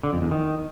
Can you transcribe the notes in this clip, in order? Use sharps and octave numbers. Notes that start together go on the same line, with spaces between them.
D3
F2
E2
D#3